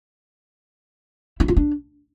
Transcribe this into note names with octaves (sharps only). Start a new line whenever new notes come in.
E4
F4
D4